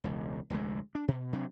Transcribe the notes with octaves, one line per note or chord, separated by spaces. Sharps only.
E1 C#2
F1 D2 A2 G#3
D4
B2
C3 F#3 C4 D4